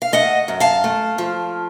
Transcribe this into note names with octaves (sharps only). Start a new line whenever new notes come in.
F5
A3 D#5 F#5
F#2
F5 A5
A3
F3